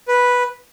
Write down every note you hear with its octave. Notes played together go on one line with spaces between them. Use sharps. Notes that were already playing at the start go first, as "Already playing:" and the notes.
B4